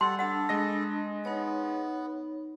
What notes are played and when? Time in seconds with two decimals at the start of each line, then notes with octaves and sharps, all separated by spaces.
0.01 G3 A4 F#5 C6
0.19 D4 A4 F#5 A5 B5
0.49 G#3 D#5 A#6
1.25 B3 D#4 C#5